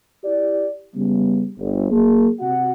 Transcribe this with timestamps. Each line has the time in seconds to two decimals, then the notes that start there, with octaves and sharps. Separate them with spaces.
0.24 E4 G4 D5
0.95 C#3 G3 B3
1.58 G1
1.91 F#3 A#3 G#4
2.40 C3 F#4 F#5